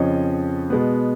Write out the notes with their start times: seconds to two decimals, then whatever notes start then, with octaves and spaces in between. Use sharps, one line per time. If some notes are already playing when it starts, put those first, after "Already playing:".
Already playing: F2 C#3 F3 C#5 D#5
0.70 B2 G#3 B3